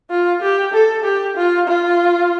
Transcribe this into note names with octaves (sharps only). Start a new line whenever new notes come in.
F4
G4
A4
G4
F4
F4